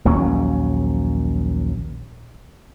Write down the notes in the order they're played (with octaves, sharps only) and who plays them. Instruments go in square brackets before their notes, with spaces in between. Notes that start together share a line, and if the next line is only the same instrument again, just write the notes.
[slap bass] A#1 D#2 F#3 C#4